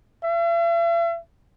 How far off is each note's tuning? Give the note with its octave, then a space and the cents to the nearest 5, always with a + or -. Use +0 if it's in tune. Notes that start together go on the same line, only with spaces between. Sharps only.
E5 +45